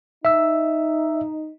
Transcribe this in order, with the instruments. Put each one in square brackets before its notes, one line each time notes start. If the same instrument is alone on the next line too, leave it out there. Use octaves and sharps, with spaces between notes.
[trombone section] D#4 [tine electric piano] E5 E6